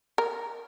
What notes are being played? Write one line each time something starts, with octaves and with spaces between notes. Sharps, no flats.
A#4